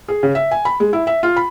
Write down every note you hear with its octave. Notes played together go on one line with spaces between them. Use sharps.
G#4
C#3
E5
G#5
B5
G#3
E4
E5
F4
B5